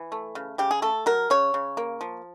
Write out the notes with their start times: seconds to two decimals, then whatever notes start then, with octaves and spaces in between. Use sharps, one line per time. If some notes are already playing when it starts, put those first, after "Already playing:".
Already playing: E3
0.12 A3
0.35 C#3
0.58 C#3 G4
0.71 G#4
0.82 A3 A4
1.06 F#3 A#4
1.30 C#3 C#5
1.54 C#3
1.77 A#3
2.01 F3